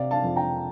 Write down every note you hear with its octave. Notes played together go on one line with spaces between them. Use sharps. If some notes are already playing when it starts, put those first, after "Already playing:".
Already playing: C3 D5 F5
F5 A5
F2
G5 A#5